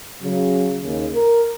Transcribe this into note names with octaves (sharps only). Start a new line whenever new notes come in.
C#3 F#3
D#2 C#3
A#4